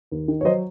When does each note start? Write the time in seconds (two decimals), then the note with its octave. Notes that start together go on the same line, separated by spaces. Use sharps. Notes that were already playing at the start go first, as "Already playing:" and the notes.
0.11 D#2
0.28 D#3
0.41 C#5
0.44 F#3 C5 D#5